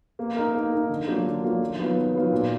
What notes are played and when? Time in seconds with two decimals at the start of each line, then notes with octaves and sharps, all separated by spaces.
0.19 A#3
0.37 D#4 A#4
0.54 A#3
0.72 D#4 A#4
0.89 D3
1.07 F#3 A#3 D4 F4
1.25 D3
1.43 F#3 A#3 D4 F4
1.61 D#3
1.79 F#3 B3 F4
1.97 D#3
2.14 F#3 B3 F4
2.32 A#2